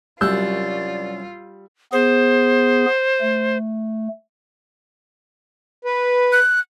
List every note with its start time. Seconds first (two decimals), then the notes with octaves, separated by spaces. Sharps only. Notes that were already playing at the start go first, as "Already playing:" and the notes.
0.21 C2 F#2 G3 F4 D5 F#5 E6 G6
1.93 B3 G#4 C5
3.21 A3
5.85 B4
6.32 F#6